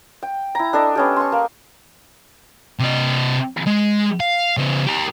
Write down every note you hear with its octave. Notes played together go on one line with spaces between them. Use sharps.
G5
E4 A#5
D4 A4 D5 D#5
B3 C#4 G4
C6 C#6
A#3
C3 D#5
G#3
F5
C#3 B3
G4 A#4